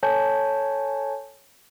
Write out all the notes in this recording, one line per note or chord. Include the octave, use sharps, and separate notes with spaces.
A4 C#5 G#5 A5 G6